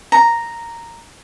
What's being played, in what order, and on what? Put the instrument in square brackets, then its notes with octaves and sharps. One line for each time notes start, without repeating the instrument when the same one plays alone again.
[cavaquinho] A#5